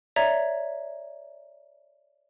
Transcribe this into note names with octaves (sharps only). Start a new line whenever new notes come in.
C#5 D5 E5 A#5 G#6